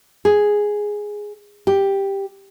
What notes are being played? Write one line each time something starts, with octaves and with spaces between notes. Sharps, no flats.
G#4
G4